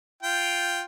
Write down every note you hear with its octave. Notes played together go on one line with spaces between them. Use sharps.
F4 G5